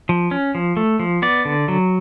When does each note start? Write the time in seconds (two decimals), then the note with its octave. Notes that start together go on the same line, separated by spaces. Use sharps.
0.09 F3
0.31 C#4
0.55 F3
0.77 A3
1.00 F3
1.22 B3 D5
1.45 D3
1.68 F#3